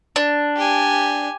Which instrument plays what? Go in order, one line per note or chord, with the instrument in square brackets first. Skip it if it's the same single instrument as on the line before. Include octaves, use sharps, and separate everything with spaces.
[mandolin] D4
[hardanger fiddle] G4 G#5